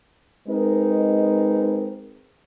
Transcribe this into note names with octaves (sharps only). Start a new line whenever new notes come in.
G#3 C4 D#4 A#4 B4